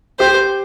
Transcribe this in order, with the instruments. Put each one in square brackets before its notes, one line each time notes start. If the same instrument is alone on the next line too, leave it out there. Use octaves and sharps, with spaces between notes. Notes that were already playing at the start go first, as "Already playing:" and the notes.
[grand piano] G4 [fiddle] C5